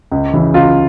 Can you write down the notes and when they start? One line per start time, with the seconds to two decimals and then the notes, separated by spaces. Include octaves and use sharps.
0.12 C#2
0.33 C#3 E3
0.54 C#2 F4